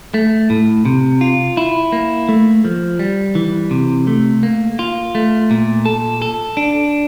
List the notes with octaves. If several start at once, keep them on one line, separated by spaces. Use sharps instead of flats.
A3
A2
C3
F4
E4
A#3
A3
F3
G3
E3
C3
A3
A#3
F4
A3
A#2
A4
A4
D4